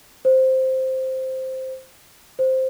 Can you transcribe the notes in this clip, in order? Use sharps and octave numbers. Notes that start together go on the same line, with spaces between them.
C5
C5